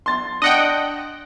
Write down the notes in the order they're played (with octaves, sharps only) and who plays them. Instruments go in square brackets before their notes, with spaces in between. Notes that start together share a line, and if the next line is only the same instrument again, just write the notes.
[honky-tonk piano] C6 A6
[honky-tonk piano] D4 [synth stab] D#5 F#5 G5